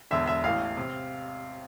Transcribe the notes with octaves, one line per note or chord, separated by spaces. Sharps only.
E1 E2 D3 E5
E5
A1 A2 E3 F5
C3